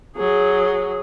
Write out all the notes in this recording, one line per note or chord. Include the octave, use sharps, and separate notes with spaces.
F#3 G#4